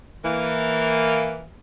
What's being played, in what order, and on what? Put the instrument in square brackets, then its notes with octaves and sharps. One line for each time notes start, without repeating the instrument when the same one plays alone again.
[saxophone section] E3 A#3